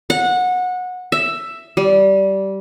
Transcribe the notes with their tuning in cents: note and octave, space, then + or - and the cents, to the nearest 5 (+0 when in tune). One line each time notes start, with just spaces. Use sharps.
F#5 -20
E5 +5
G3 -15